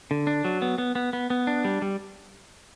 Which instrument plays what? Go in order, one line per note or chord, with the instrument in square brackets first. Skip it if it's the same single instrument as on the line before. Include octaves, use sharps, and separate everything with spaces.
[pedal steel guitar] D3
D4
F#3
B3
B3
B3
B3
B3
D4
G3
G3